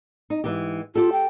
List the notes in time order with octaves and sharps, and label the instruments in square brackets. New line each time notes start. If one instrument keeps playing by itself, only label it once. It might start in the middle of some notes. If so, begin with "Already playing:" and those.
[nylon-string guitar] D#4
G#2 E3 G4
[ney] F4 [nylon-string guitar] G4 A4
[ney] G5